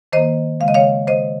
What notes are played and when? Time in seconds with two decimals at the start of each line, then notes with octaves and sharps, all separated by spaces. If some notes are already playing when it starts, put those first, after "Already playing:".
0.12 D#3 A#3 C5 D#5
0.60 C#3 G#3 F5
0.68 D#5
0.74 C#5 F5
1.07 D#3 G#3 C5 D#5